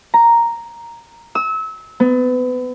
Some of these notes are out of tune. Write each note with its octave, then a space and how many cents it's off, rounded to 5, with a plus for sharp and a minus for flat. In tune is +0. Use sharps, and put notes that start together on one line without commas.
A#5 +0
E6 -30
B3 +30